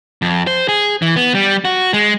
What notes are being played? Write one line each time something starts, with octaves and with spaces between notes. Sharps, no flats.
F2
C5
G#4
E3
B3
G3
F#4
G#3